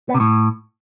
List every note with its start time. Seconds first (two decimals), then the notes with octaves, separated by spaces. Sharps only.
0.09 B3
0.14 C3
0.20 A2